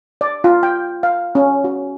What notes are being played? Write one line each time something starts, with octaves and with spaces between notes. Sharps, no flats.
D5
F4
G5
F5
C#4
F#4